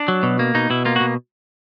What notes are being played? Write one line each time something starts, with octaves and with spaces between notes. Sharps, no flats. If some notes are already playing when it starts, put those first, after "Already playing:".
Already playing: D4
F#3
B2
A#3
B2 D#4
B2 E4
A#3 F4
F#4
B2